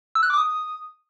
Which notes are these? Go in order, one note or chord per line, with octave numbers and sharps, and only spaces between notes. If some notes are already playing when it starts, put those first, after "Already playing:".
E6
F#6
D6
D#6